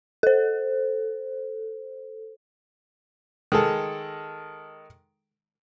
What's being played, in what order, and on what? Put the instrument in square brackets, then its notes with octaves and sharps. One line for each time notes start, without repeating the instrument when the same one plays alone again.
[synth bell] A4 C5
[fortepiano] D#3 G#3 A4